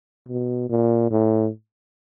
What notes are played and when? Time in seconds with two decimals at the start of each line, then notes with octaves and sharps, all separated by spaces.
0.28 B2
0.70 A#2
1.11 A2